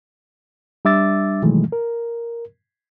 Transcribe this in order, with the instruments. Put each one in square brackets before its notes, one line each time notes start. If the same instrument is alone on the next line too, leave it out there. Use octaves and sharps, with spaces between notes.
[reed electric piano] G3 D4 E5 D6 E6 A6
B2 D#3 E3 F#3 G#3 A3
A#4